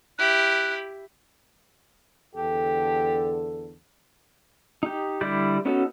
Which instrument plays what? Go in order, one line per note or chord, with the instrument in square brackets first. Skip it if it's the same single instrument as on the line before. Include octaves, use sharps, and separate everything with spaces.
[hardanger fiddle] E4 G4 [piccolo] F#6
[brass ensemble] E2 D3 A4 [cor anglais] G4
[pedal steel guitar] D#4 G4
D3 G3 E4 D5 G6
B3 C#4 D#4 F#4 A4